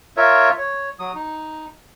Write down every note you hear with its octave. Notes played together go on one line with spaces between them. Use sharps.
F4 A#4 C#5 E5
C#5
F#3 D#6
D#4